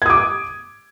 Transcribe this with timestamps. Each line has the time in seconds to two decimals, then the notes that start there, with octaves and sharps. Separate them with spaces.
0.02 G#6
0.06 D#6
0.10 D6